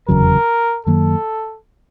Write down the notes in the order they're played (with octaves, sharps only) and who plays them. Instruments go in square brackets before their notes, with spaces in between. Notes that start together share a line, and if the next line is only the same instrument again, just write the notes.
[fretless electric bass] F1 E2 C#3 F#3 [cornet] A#4
[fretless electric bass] F#2 D#3 F#3 A#3 [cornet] A4